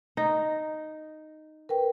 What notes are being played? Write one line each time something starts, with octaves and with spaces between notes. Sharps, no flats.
D#4
A#4 B4 G5